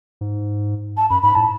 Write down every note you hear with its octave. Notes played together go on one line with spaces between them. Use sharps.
G#2
A5
F#2 B5
G#2 B5
A2 A5